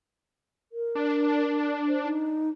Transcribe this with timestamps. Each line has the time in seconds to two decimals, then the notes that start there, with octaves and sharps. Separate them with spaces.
0.72 A#4
0.95 D4
1.88 C5
2.04 D#4